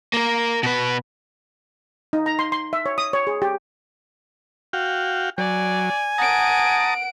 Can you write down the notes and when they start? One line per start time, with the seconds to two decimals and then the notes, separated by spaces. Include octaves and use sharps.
0.13 A#3 A#4
0.63 B2 B4
2.13 D#4
2.26 A#5
2.39 C6
2.52 C6
2.73 E5
2.86 C#5
2.98 D#6
3.13 C#5
3.27 G#4
3.42 G4
4.73 F#4 F5 G5
5.38 F#3 D5 G#5
6.18 F#5 A5 A#5 D#6 D7